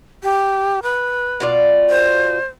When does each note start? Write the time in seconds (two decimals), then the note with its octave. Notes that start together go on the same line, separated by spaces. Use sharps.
0.23 G4
0.83 B4
1.40 B2 F4 D5
1.90 C5